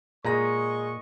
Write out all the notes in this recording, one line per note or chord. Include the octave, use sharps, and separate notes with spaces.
A#2 G#3 D#5 A#5 C#6 A#6